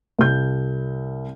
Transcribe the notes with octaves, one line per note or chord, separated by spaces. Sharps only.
C2 G6